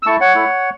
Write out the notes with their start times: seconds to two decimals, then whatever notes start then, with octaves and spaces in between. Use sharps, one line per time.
0.03 E6
0.07 A3 E4 A5 C#6
0.21 C#5 F#5
0.35 A3 E4